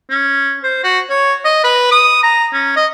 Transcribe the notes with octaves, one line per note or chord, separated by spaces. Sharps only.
C#4
C5
F#4
C#5
D#5
B4
D#6
A#5
C#4
D#5